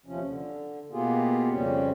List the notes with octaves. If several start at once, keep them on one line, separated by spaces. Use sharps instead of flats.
D#2 C3 F3 C#4
D3
B2 A#3 B3 F4 G4 G#4
F2 C#3 G3 C4 C#4